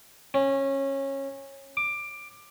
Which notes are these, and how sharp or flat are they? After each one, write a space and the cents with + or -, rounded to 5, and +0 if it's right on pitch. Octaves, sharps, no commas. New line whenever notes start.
C#4 -20
D6 +15